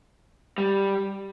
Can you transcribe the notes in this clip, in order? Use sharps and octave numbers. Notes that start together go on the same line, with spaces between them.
G3